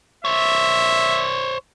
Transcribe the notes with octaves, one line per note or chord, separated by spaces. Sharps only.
C5 C#5 E5